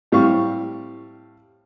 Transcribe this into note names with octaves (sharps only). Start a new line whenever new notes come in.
A2 G3 C4 F5 C#6